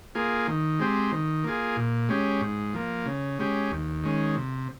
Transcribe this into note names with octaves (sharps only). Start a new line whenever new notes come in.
A#3 F4 G#4
D#3
G#3 C4 G4
D#3
A#3 F4 G#4
A#2
G#3 C#4 G4
G#2
F3 A#3
C#3
G#3 C#4 G4
D#2
D#3 G#3 C#4
C3